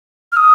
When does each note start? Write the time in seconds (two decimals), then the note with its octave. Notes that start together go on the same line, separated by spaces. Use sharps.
0.32 F6
0.37 D#6